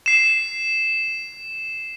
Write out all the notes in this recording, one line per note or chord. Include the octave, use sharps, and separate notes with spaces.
C7 E7